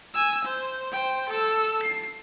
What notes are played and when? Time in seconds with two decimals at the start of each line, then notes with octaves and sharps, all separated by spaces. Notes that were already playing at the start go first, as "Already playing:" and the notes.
0.14 G#5 E6
0.45 C5
0.92 C5 G5
1.29 A4 E6
1.83 C7